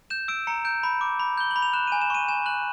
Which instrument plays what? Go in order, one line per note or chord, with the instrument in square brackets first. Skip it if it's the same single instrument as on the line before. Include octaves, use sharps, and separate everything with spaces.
[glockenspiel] G6 E7
E6 D7
A#5 C#7
G6 D7
B5
D6
B5
G6 G7
F#7
B5
F7
F#6 E7
G#5 D#7
E7
C#6 D#7
G#5 E7
F#6 F#7